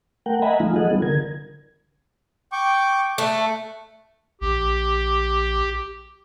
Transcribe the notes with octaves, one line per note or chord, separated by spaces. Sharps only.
A3 A#4 F#5 G5
D#5 E5 F#5 G#5 A#5 B5
F3 G#3 A3 D#4 F4
F3 G#4 A4 D#5 F#5
G3 B3 D#4 F4
D3 A#4 G#6
G5 C#6 D6
A3 A4 F#6
A#1 G4